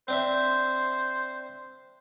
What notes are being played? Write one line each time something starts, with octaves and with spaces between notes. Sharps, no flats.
C4 D4 C5 E5